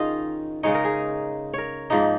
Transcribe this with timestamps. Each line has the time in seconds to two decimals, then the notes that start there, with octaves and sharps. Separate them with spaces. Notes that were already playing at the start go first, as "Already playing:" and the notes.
Already playing: D#3 C#4 D#4 F4 G#4 D#5
0.63 C#3 G#3 D#4 C#5
0.75 A#4
0.85 G#4
1.54 A#4 C#5
1.90 G#2 F3 A#3 D#4